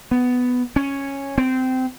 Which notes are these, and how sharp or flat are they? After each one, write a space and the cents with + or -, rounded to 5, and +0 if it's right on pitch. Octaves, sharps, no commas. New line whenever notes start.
B3 +10
C#4 -5
C4 -20